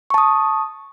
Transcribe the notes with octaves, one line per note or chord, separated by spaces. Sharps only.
A5 C#6 D#6